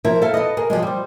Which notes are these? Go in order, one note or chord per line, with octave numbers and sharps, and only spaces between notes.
F3 E4 A#4
A4 E5 F5
A4 B4 D#5
G#4 A#4
F3 G3 G#3
G3 C5